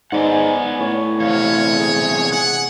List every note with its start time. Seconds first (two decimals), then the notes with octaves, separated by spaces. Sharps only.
0.12 G#2 B3 D5 F#5 G#5
0.79 A2 C#5
1.20 E2 C3 C#5 F5
1.76 G#4
2.32 F#5